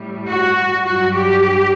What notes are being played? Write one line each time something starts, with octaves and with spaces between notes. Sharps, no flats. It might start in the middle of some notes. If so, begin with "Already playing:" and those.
Already playing: A2 G3
F#4
G2 F#3 F#4
G4